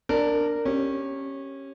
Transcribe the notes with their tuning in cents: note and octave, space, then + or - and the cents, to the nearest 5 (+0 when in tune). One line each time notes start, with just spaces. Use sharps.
D4 +0 A#4 -15
C#4 -20 G4 +0